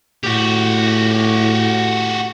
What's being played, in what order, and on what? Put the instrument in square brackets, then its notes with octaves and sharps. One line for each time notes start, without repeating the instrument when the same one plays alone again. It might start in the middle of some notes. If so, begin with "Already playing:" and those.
[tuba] A2 [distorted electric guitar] F#4 G4